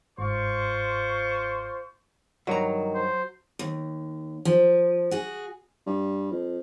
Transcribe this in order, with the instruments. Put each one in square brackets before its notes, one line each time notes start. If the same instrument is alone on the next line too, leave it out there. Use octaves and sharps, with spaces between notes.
[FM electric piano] G1 G#2 [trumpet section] F4 C5 C#6
[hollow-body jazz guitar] G2 A#5 [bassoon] D#3 [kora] F#3
[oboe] C5
[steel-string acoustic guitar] D#2
F3
F#4 G#4
[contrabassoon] G2
F2